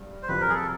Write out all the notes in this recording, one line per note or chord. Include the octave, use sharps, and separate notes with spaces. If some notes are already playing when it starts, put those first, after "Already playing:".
Already playing: G2
C5
F2 C3 F3 B4
A#4
G#4
A4